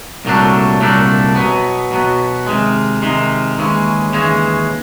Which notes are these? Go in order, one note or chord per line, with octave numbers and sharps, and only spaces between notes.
C2 A#2 F#3 A3 D4
C2 A#2 F#3 A3 D4
B2 F#3 B3
B2 F#3 B3
C3 D#3 G#3
C3 D#3 G#3
D#2 C#3 E3 G#3 C#4
D#2 C#3 E3 G#3 C#4